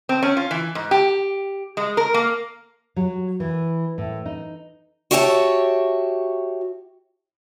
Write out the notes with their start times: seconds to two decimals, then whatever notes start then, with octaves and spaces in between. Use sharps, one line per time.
0.09 C4
0.23 C#4
0.37 F4
0.51 E3
0.75 G#2
0.91 G4
1.77 G#3
1.97 A#4
2.14 A#3
2.96 F#3
3.40 E3
3.98 A2
4.26 D#4
5.11 F#4 G4 C#5 E5 F#5 A5